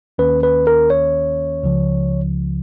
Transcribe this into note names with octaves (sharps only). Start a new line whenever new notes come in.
D#2 D#3 A#3 C#4 B4
B4
A#4
C#5
C#2 C#3 F3